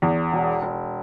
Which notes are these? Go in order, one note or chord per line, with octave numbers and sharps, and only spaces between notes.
E2
E1
E1